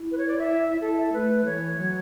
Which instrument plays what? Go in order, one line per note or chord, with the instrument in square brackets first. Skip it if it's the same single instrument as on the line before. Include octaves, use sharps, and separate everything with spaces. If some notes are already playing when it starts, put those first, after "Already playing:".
Already playing: [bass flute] E4
[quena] B4
C#5
D5
E5
[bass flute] E4 [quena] A4
[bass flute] A3 [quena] B4
[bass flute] E3 [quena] C#5
[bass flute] F#3